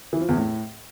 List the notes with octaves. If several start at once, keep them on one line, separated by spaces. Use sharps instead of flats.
E3
F3
E2
A2